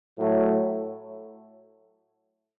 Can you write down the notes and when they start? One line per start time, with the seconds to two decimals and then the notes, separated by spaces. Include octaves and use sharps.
0.17 A2 F#3 A3